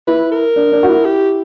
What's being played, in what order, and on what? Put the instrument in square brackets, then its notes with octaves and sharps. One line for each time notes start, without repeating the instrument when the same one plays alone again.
[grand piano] E4 [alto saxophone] B4
[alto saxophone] A#4
[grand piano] D4
D4
F#4
E4
[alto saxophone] G4